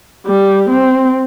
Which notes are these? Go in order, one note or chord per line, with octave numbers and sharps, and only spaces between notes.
G3
C4